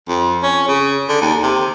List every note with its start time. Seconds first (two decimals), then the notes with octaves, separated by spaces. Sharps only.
0.09 F2
0.43 C#4
0.68 C#3
1.09 D3
1.22 D#2
1.43 C3